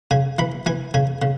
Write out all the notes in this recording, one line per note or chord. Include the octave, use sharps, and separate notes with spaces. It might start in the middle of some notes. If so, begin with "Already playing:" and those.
C#3 G#5
E3 B5
E3 G#5
C#3 G#5
C#3